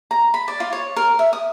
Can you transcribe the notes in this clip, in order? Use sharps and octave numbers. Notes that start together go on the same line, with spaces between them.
A#5
B5
D5
F4
C#5
A#4
E5
D#6